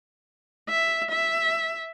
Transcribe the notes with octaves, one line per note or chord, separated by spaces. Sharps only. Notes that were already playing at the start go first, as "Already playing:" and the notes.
E5
E5